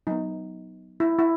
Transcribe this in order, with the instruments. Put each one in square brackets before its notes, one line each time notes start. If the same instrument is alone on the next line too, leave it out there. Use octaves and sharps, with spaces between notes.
[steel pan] F#3 B3 D#4
E4
E4